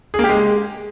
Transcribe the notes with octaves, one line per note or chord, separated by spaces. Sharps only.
G#4
A#3
G4
G#3